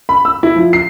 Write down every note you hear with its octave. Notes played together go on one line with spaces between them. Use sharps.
B5
E6
E4
F3
C7